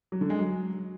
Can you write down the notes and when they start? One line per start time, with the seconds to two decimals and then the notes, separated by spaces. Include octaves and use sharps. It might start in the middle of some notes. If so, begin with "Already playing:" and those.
0.12 F#3
0.21 D3
0.30 G#3
0.39 F#3